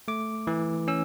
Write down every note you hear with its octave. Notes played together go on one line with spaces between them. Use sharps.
A3 D6
E3
C#4 E6